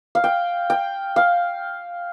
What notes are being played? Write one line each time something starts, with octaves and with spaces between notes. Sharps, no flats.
F5
G5
G5
F5